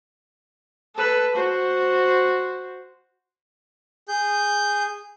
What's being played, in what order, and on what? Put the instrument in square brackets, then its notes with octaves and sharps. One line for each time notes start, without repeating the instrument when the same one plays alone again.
[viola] A4 B4
F#4 C5
[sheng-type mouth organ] G#4 G6